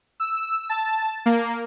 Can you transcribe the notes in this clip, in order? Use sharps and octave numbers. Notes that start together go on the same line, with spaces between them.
E6
A5
A#3